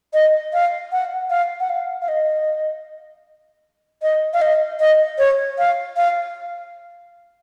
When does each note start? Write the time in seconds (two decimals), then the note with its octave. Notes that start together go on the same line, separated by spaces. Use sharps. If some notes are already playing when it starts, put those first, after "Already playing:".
0.14 D#5
0.53 F5
0.92 F#5
1.30 F5
1.60 F#5
1.70 F5
2.02 F5
2.08 D#5
4.02 D#5
4.34 F5
4.42 D#5
4.80 D#5
5.19 C#5
5.58 F5
5.97 F5